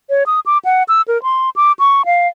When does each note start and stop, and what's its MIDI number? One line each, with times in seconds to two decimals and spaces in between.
0.10 0.23 73
0.26 0.40 87
0.46 0.58 86
0.65 0.83 78
0.88 1.02 88
1.08 1.21 70
1.23 1.50 84
1.56 1.72 86
1.79 2.05 85
2.05 2.28 77